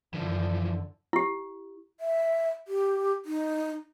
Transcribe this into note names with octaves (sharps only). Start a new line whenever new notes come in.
F#2 D3 E3 F3
E4 G4
E5
G4
D#4